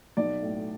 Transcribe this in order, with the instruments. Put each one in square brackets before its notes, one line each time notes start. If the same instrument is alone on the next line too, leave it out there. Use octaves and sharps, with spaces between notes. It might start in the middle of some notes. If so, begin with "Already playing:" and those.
[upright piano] B1 D5
A2